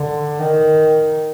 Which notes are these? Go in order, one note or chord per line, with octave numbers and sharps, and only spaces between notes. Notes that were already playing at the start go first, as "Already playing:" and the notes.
Already playing: D3
D#3